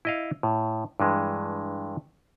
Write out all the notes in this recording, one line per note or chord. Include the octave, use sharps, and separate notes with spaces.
E4 D#5 F5
A2
G2 E3 G#3